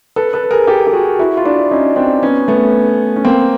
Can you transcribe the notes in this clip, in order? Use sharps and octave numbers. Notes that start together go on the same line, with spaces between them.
A4 B4
A4 B4
B4
G#4 A#4
G4 A4
G4
F#4 G#4
E4 F#4
F4
D4 E4
C#4 D#4
C4 D4
B3 C#4
A3 B3
C#4
A#3 C4